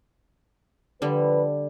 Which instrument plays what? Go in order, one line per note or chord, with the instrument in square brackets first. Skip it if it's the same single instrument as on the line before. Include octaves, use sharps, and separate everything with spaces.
[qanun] D3 G3 [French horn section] F3 B4